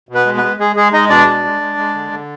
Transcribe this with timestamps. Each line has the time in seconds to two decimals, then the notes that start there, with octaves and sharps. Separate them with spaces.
0.09 B2
0.15 B3 B4
0.26 G#3
0.37 B3 B4
0.43 G#3
0.59 G#3 G#4
0.76 G#3 G#4
0.93 G#3 D#4 D#5
1.09 B2 D4 D5
1.27 G#3
1.44 G#3
1.61 G#3
1.77 G#3
1.94 D3
2.11 D3